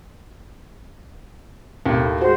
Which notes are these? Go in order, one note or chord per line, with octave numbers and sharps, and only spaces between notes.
D#2 A2
G#3 F#4 C5